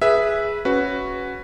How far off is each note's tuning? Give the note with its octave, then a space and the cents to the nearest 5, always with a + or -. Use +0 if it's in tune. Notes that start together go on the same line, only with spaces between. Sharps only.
G#4 +0 B4 -15 E5 +0
C#4 -5 F#4 +0 B4 +5